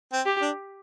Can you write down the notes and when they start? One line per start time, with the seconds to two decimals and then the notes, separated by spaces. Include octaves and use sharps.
0.12 C4
0.26 G4
0.41 D4